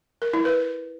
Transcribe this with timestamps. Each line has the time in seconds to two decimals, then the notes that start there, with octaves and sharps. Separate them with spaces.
0.22 A#4
0.33 E4
0.45 B4